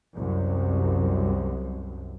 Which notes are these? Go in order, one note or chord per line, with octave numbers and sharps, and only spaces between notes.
C2 F#2